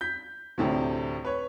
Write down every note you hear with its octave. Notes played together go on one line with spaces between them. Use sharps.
G6 B6
D2 A2 C3
B4 C#5